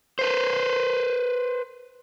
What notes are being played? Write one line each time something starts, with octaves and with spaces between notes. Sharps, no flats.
B4 C5